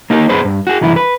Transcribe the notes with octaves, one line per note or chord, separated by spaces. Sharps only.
A#3 D#4 G4 A#4
F#2 B3 G#4 B4 C5
G2
F#4 G#4
C2 F#2 E3 E4
B4